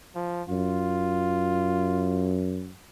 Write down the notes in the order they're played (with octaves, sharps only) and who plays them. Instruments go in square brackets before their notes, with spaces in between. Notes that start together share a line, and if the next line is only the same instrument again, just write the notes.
[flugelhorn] F3
[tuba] F#2 [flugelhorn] F4